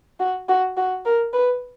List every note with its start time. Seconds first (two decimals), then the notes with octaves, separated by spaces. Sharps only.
0.20 F#4
0.49 F#4
0.77 F#4
1.05 A#4
1.33 B4